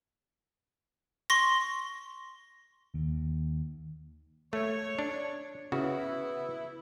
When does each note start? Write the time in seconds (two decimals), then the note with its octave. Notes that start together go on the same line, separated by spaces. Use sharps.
1.30 C6 C#6 A#6
2.94 D#2
4.53 A3 C#5
4.99 D4
5.72 C#3 E3 B3 E4 F#4